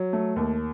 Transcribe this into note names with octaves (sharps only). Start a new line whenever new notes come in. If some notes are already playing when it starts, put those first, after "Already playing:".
Already playing: F#3
A3
D#2